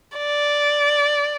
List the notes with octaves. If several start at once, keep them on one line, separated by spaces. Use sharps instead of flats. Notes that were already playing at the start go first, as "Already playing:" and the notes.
D5